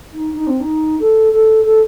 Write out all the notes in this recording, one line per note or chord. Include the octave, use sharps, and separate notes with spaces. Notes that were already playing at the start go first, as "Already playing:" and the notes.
D#4
D#4
C4
D#4
A4
A4
A4